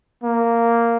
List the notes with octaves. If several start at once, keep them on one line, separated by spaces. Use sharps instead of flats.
A#3